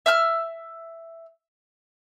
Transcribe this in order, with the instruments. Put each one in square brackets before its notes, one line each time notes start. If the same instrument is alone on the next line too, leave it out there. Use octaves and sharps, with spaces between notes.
[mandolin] E5 E6 F6